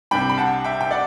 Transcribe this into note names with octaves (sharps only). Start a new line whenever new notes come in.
C2 C3 G3 D4 G5 B5
B5
F#5 A5
E5 G5
G5
D5 F#5